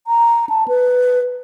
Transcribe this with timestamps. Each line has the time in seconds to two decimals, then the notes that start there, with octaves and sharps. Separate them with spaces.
0.07 A#5
0.49 A5
0.68 B4